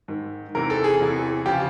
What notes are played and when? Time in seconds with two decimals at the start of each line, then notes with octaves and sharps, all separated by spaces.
0.08 G#2 D#3
0.55 E2 C3 E3 A#4
0.70 A4
0.84 G#4
1.00 E2 C3 E3
1.46 C#3 F3 G4